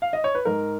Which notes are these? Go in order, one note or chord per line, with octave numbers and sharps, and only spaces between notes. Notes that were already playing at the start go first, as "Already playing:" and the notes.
F5
D#5
C#5
B4
G#2 A#4